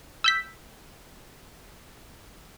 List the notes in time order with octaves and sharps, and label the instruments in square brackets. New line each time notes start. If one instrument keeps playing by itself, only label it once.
[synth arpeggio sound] E6 G6 B6